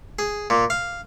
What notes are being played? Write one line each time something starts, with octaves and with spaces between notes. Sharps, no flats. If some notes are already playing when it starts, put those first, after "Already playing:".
G#4
A#2
F5